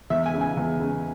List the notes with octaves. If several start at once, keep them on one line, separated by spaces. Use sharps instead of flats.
E2 E5
G#5
C#3 G#3
G#5
E2
C#3 G#3